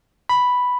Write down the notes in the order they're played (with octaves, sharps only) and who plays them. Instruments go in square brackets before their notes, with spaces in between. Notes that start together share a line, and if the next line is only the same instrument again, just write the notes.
[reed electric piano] B5